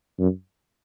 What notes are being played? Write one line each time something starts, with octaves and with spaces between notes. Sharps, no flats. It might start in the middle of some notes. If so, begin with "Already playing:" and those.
F#2